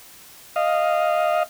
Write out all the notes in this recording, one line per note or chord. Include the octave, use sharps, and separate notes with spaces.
D#5 F5